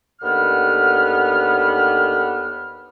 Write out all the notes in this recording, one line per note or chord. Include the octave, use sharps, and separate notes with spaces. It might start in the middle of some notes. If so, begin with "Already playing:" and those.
D#2 D3 B3 F6